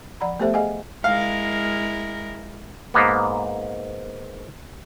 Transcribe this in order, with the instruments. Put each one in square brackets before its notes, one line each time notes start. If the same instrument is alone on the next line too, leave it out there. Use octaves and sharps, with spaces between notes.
[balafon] F3 D5 F#5 A#5 B5
A3 B3 G4 A4 C5 E5
G#4 D#5 F5 F#5 G#5
[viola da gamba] G#3 E4 A#4 [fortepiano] F5
[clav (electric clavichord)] G#2 A#3 B3